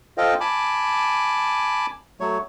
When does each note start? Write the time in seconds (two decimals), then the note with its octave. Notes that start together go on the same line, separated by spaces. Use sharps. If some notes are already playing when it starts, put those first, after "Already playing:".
0.18 F4 A4 C5 D#5 F5 G5
0.40 G#5 A5 B5 D6
2.20 F#3 A3 C#5